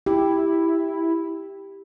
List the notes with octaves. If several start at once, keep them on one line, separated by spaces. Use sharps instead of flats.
E4 G4